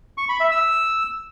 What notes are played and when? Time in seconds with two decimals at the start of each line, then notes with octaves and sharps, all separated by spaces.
0.18 C#6
0.29 B5
0.40 E5
0.51 E6